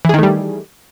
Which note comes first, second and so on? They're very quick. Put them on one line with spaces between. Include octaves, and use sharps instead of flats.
E3 G#4 D#3 A3 G3